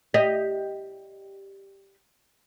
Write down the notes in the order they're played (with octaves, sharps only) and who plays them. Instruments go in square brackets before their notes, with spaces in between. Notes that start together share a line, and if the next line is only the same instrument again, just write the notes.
[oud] G4 D#5